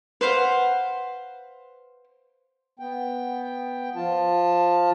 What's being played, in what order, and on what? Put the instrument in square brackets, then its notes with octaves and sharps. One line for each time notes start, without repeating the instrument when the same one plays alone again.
[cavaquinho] B4 C5 F5 F#5
[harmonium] B3 G5
F3 F4 A5